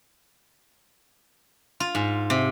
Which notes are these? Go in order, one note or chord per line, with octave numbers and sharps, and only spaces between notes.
F4
G#2
C3